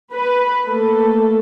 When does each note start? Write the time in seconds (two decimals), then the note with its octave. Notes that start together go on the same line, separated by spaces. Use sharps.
0.12 B4
0.66 A3 A#3 A4